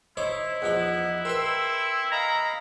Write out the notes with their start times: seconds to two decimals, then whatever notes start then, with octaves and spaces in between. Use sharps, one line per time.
0.17 D#4 E4 C5 C#5
0.62 E2 F3 D#4 F#5
1.25 A#4 B4 G5 C6 E6
2.12 D#5 F5 A#5 B5